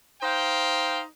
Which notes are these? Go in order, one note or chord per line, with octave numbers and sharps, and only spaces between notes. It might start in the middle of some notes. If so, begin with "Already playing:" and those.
D#4 C5 F5 G5